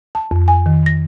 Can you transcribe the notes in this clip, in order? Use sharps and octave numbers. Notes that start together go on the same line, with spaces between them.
A5
F2
G#5
D#3
A#6